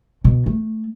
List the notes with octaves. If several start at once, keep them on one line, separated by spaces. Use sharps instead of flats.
B2
A3